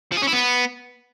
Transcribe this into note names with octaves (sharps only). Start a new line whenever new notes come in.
F3
G#4
C#4
E4
B3